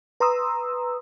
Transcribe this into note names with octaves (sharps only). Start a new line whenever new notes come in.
B4 A#5 C6 D#6 E6